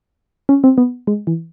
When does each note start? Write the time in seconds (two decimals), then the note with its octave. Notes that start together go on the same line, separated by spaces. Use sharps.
0.49 C#4
0.64 C4
0.78 B3
1.07 G#3
1.27 E3